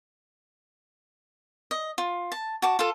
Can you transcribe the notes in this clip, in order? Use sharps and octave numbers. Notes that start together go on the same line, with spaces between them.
D#5
F4
A5
F#4 A5 D6
F4 A4